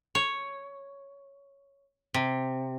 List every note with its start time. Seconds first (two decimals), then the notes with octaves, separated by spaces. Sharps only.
0.15 C#5
2.14 C3